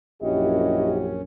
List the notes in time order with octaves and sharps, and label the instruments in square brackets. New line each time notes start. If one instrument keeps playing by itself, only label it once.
[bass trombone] A#1 [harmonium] F#2 C#4 [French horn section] E4 F#4 G4 [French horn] D#5